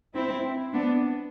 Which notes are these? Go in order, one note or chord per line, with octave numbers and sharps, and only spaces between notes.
C4 E4
B3 D4